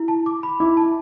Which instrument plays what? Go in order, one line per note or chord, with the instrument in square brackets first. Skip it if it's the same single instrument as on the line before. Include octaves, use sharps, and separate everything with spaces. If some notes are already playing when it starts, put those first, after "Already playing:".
Already playing: [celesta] E4
A5
D6
B5
[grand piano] E4 [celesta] D6
[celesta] A5